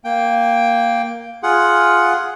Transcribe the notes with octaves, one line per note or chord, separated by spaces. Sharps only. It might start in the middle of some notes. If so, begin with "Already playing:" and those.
A#3 G5
F4 G#4 F#5